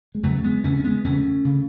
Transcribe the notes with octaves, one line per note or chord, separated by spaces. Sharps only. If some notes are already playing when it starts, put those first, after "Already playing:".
G#3
E2 C#3 F#3 A3
G#3 B3
E2 C#3 A3 C#4
C#4
G#3 B3
E2 C#3 A3 C#4
C#3